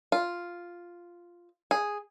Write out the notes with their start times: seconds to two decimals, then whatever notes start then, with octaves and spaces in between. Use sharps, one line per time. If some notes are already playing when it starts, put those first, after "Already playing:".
0.12 F4
1.71 G#4